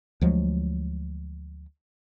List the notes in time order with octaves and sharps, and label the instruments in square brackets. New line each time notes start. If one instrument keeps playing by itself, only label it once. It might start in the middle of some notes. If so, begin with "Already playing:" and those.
[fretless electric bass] D2 F3 F#3 G#3